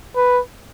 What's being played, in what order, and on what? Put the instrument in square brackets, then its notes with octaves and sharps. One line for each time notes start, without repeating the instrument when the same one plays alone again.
[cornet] B4